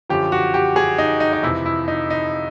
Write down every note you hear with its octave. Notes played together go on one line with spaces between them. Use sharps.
F#2 D3 F3 G4
F#4
G4
G#4
D#4
D#4
D#4
F2 C3 E3 E4
E4
D#4
D#4